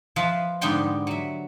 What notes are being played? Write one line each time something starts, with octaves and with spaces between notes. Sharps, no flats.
F3 B4 E5 F5 B5
G#2 D3 G3 B3 G5 C6
F#3 E5